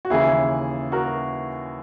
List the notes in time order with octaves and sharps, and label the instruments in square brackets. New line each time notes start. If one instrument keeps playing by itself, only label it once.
[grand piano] F#4
D#2 C#3 E3 E4 G#4
F#4 A#4